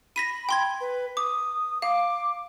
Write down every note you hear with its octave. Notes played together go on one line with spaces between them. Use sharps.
B5 A#6 B6 D#7
G5 C6 G#6
B4
D6 D#6
F5 D6